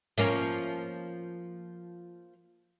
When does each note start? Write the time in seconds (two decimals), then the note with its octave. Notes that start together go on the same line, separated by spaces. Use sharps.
0.18 F3 A#3 C#4